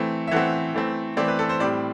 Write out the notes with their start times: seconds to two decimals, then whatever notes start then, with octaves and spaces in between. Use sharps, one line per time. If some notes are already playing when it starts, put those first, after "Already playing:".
Already playing: E3 A3 C4
0.28 E5
0.31 E3 A3 C4 F#5
0.74 E3 A3 C4
1.17 E3 A3 C4 D5
1.28 B4
1.39 A4
1.49 C5
1.59 A2 G3 C4 D5